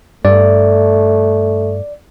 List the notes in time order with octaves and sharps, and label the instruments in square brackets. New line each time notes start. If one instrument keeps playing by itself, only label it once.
[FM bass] G2 [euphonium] A3 [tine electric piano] D5